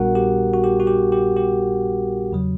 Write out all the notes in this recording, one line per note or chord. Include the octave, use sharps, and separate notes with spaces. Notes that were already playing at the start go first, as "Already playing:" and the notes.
Already playing: A#1 A#2 G3 B3 D4 F#4 A#4 F#5
G4
F#4
G4
F#4
G4
G4
G4
E2 C#3 F#3